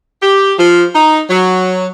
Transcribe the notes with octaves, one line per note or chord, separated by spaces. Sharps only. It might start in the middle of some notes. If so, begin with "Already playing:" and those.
G4
F3
D#4
F#3